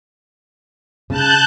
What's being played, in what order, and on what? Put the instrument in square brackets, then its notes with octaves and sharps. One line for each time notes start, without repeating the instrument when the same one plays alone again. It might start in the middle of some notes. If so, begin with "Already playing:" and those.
[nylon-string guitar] C#3 [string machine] A5 F#6 G6